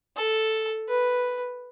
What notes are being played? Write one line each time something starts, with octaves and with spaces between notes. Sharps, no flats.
A4
B4